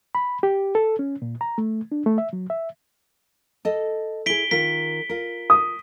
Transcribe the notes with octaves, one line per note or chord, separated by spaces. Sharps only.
B5
G4
A4
C#4
A#2
A#5
A3
D4
A3
E5
F#3
E5
A4 D#5
E4 G#4 B6 D7 G7
D#3 F4 A#4 B6
F4 A#4
D#6